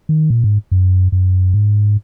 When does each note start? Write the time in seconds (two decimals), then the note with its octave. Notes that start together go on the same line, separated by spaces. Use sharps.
0.09 D#3
0.30 A#2
0.44 G#2
0.71 F#2
1.12 F#2
1.53 G#2